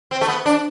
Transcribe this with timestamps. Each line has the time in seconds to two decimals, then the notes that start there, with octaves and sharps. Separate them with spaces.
0.11 C4
0.21 A3
0.28 B3
0.46 D4